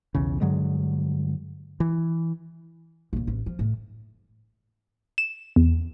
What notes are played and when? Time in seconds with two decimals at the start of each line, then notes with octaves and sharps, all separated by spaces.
0.15 B1 E2 C#3
0.41 G2 D3 F#3 G#3
1.80 E3
3.13 A#1 D#2
3.27 A1
3.46 F3
3.59 A2
5.18 E7
5.56 E2